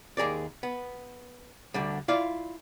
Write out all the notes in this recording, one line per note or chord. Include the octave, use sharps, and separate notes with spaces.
D#2 G#4 A#4 D5
B3
D2 D3 G3
E4 F4 D5 F5